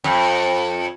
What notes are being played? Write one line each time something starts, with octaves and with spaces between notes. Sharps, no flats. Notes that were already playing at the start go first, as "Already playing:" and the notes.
F2